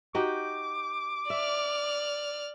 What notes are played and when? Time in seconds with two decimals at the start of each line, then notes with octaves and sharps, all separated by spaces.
0.15 D#4 F#4 G4 D6
1.30 D5 E5 F6